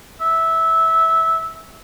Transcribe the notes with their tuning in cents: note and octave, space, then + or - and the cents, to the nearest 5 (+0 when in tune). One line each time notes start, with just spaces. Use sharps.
E5 -15